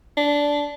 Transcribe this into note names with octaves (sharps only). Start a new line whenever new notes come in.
D4